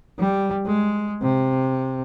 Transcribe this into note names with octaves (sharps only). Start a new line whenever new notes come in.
G3
G#3
C3